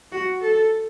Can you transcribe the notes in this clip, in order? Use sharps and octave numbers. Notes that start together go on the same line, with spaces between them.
F#4
A4